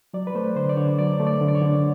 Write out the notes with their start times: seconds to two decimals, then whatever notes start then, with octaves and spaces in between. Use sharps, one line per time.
0.14 F#3 D5
0.27 B4
0.35 A3 C5
0.56 D3 C5
0.69 D5
0.77 D3 C#5
0.99 F#3 D5
1.20 A3
1.27 D5
1.41 D3
1.48 D5
1.55 C#5
1.62 D3